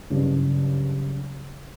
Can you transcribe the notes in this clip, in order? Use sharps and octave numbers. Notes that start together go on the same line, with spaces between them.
F#1 G2 C#3